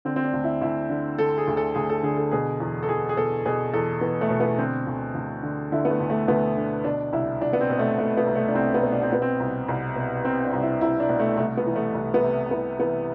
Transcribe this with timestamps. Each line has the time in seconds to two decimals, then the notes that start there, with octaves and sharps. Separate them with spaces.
0.05 D3 C4
0.16 C4
0.24 D4
0.34 D2
0.44 E4
0.62 D2 E4
0.90 D3
1.18 D3 A4
1.38 G#4
1.48 D2
1.57 A4
1.75 D2 G#4
1.90 A4
2.03 D3 G#4
2.17 A4
2.31 B2 G#4
2.60 E2
2.83 A4
2.89 E2 G#4
3.09 G#4
3.17 B2 A4
3.46 B2 G#4
3.74 E2 A4
4.01 E2 B3
4.21 A3
4.30 B2
4.40 B3
4.58 D3 C4
4.87 D2
5.15 D2
5.43 D3
5.72 D3 E4
5.85 B3
5.90 A3
6.00 D2
6.10 A3
6.28 D2 B3
6.57 D3
6.84 B2 D4
7.13 C2 E4
7.41 C2 D4
7.53 B3
7.61 C4
7.70 B2
7.79 A3
7.98 B2 A3
8.17 B3
8.27 C2
8.35 A3
8.48 D4
8.54 C2 C4
8.74 B3
8.83 B2
8.92 D4
9.03 C4
9.12 B2 B3
9.22 C4
9.40 C2
9.68 C2
9.96 B2
10.24 B2 C4
10.44 D4
10.53 C2
10.62 E4
10.81 C2 E4
11.00 D4
11.09 B2
11.20 A3
11.37 C2 A3
11.57 B3
11.66 E3
11.76 A3
11.95 C2
12.14 B3
12.23 C3
12.51 C2 B3
12.79 E3 B3